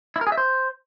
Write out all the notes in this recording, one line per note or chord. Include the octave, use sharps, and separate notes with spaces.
E4
A#4
G#4
E5
C5